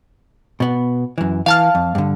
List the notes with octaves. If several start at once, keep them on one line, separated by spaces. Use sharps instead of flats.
B2 B3
F#2 E3
E3 F5 A5 F6
F2
G2 D3